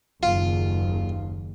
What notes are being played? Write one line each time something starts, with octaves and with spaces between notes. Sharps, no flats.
F#1 D#2 F4